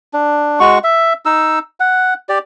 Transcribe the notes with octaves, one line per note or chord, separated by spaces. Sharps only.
D4
G#3 F#4 C#6
E5
D#4 E6
F#5
G4 D5